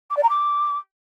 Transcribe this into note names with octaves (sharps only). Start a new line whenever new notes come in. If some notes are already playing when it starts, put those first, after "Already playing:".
D6
D5
A#5
D6